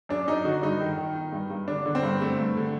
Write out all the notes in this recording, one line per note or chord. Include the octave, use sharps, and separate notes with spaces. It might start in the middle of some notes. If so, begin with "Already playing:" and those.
F#2 D4
F#2 D#4
D3 F#4
G2 D#4
D#3
D#3
D#3
G2
G2
D3 D4
D3
C4
G2
D3 A3
G2
D3